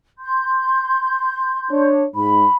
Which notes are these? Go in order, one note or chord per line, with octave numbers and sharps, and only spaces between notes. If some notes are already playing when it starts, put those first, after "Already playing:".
C6 G6
D4 C#5
G#2 B5